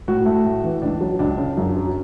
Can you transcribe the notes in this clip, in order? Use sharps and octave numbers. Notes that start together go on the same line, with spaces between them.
A2 F#4
A3
A2
E3
C#2 D4
F#3
C#2 D4
C#3
F#2
F#3